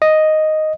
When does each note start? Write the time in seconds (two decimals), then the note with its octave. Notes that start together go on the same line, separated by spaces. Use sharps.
0.02 D#5